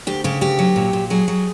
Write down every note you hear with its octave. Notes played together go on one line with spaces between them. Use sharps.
D2 G4
C#3 G4
D2 G4
F#3
A#2
A#2
F#3 G#4
F#3